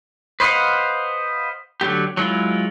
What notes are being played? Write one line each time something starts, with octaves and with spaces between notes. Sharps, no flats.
B4 C5 D#5 F5 F#5
D3 F#3 A3 G4
F#3 G#3 E4 F4